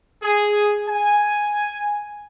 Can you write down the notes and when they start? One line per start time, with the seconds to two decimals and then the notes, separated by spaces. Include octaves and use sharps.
0.23 G#4
0.87 G#5